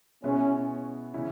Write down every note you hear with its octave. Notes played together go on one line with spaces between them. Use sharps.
B2 G#3 B3 C#4 E4
C#3 E3 C#4 E4